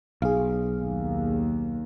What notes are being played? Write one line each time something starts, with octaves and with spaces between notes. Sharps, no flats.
B1 G#4 F5
D#2